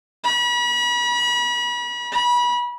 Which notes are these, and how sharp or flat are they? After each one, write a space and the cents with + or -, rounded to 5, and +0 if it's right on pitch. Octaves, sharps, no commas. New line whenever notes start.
B5 -40
B5 -30